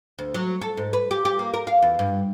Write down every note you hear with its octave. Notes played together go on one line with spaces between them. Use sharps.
D2
F#3
A4
G#2
B4
G4
G4
A#3
A#4
F5
E2
G2